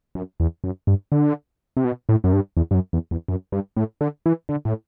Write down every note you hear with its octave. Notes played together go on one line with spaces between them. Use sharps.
F#2
E2
F#2
G2
D3
C3
B2
A2
F#2
G2
E2
G2
F#2
E2
E2
F#2
G2
A2
D3
E3
D3
A2